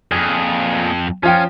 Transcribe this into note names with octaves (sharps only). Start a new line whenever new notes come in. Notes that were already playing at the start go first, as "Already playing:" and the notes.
F2 A#2 G#4
F3 C#4 F4 G5